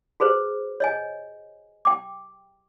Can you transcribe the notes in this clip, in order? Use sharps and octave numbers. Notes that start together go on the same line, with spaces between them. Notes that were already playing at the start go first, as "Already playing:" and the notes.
F#4 G#4 B4 C5
C#5 D#5 G#5
G5 D6